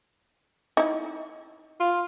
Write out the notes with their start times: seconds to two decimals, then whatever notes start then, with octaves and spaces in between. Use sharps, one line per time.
0.77 D#4 E4
1.80 F4